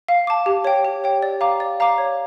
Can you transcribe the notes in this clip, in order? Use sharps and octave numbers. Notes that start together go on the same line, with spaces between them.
F5
A5 D6
G4
C#5 G5
G4
C#5 G5
D5
F5 A#5 D6
D5
F5 A#5 D6
C#5